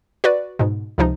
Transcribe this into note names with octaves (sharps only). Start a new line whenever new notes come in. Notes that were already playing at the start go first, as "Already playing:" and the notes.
F#4 B4 D5
G#2 B2
C#2 C3 F3 D#4